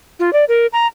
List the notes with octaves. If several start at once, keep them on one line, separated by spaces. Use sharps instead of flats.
F4
D5
A#4
A#5